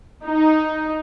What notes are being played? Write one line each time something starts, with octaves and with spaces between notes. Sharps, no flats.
D#4